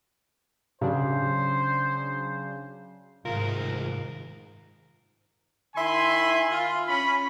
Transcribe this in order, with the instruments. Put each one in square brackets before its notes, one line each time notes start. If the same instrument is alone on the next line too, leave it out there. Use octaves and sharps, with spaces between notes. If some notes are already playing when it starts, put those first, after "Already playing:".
[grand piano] C#3 [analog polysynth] F#3 D4 [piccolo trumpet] C5
[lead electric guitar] C2 D#3 [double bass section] G#2 [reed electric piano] F4 [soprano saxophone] A#4
[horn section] D#3 E4 E5 G#5 B5 C6
F4
C#4 B5